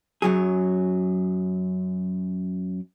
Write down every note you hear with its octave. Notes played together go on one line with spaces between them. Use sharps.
F#2 F#3 G#4